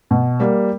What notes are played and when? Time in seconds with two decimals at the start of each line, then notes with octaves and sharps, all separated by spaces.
0.11 B2
0.40 G3 A#3